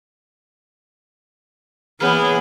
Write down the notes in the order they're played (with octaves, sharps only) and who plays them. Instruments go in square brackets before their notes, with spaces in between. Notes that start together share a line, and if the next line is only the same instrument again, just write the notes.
[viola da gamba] E3 A#3 [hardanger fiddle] B3 [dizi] G#4 [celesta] C#5 B5 F6